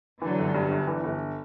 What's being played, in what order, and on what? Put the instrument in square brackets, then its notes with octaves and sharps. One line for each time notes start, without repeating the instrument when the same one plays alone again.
[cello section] D3 F#3 [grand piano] E3
[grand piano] G1
G2
G1
E3
G1